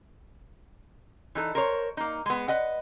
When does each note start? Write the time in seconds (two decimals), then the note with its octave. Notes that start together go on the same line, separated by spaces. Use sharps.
1.35 E3 D#4 A4
1.55 A#4 C5 C#5
1.97 A#3 D#4
2.26 G#3 B3
2.48 B4 D#5 F#5